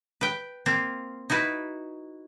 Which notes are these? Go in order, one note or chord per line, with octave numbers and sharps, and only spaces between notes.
B4 G5
A#3 C4 F4
D#4 E4 F#4 B4